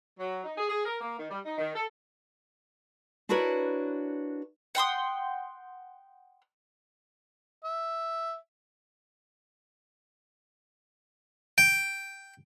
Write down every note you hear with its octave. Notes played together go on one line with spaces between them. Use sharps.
F#3
D#4
G#4
G#4
A#4
A#3
D#3
G3
D#4
D#3
A4
D4 E4 F#4 A#4 B4 C#5
F#5 G5 C6 D#6
E5
G5